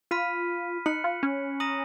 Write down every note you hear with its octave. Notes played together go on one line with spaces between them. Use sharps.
F4 B5 F6 B6 D#7
D#4 F#6 C#7 F#7
F4
C#4
A#5 D#6 A#6 D#7 F#7